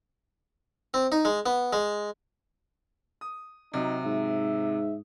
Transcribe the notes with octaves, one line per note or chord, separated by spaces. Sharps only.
C4
D#4
G#3
B3
G#3
D#6
C3 F#3 D#4
G#2 E5